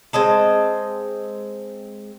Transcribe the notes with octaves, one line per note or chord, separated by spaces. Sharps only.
G#3 C4 D#5 A5